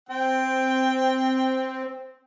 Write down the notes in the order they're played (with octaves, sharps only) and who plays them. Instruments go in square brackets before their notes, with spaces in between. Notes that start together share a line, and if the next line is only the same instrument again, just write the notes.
[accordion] C4 [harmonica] G5